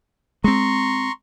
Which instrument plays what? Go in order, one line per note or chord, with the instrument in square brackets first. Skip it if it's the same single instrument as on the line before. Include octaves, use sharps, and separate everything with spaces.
[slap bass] G#3 C4 [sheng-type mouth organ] A#5 C6 C#6